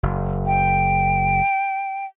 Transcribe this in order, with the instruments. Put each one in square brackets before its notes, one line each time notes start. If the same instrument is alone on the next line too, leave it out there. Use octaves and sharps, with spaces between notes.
[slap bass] F#1
[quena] G5